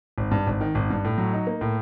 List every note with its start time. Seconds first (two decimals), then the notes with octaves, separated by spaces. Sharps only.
0.18 G#1
0.31 G2
0.47 G#1
0.61 D#3
0.75 G#1
0.90 G2
1.05 A2
1.18 F#3
1.33 D#4
1.47 A#3
1.61 A2